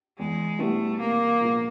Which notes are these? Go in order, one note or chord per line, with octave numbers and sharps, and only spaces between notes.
E2 G#3
B2 G3 A3 B3 E4
C2 A#3
A#2 F3 G#3 B3